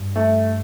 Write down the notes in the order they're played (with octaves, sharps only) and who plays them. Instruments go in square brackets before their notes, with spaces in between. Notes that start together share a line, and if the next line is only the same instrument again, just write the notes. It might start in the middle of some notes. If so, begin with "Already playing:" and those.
Already playing: [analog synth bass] G2
[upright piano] A3